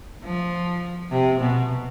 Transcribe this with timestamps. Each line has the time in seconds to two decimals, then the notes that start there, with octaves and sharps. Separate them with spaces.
0.23 F3
1.11 C3
1.40 B2